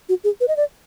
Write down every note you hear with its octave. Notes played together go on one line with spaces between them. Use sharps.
F#4
G#4
B4
D#5
D5